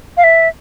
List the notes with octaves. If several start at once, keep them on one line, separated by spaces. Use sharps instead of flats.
F5
E5